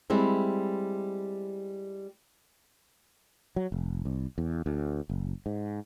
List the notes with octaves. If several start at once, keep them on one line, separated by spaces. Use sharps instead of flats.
G3 G#3 C4 E4
F#3
F1
C2
E2
D2
F#1
G#2